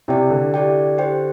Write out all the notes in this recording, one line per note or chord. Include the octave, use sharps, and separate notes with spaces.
C3 E4 G4 D5 G5
D3
E4 G4 D5 G5
G4 C5 G5